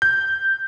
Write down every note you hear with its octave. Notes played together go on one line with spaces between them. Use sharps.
G6